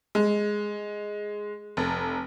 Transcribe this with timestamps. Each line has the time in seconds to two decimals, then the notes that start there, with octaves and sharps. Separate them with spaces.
0.15 G#3
1.77 F1